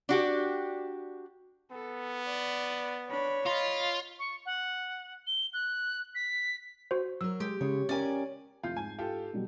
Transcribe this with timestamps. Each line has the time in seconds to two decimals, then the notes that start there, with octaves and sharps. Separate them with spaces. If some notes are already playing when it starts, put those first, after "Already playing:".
0.09 D4 F#4 G4
1.71 B3 A4
2.25 D5
3.10 D4 C#5 B5
3.46 F4 D#5 B5
4.19 C#6
4.46 F#5
5.27 G7
5.54 F#6
6.15 B6
6.91 F#4 C5
7.21 F#3 A#4 E6
7.40 G#3 G4
7.61 C#3 G#3 C#5
7.89 C#4 G4 A#4 D5 G#5
8.63 F1 F4 G6 C7
8.77 G#2 G#5
8.98 F4 G4 A4
9.33 B2 F#3 G3